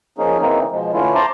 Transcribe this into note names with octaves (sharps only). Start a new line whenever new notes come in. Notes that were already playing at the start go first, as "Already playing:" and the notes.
F3 A#3 C#4 D#4 G#4
C#3 E3 A#3 C4 D#4
B2 F3 G#3
D3 E3 A3 C#4 E4 F4
C5 A5 A#5 C6 D6